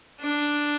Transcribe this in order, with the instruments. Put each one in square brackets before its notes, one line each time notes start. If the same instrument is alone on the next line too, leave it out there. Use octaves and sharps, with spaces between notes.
[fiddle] D4